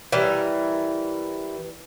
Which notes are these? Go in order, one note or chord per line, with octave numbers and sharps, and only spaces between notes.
E3 G3 A#4